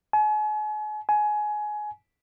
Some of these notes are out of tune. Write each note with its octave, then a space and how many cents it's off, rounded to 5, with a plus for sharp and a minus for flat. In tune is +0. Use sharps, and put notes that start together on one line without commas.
G#5 +40
G#5 +20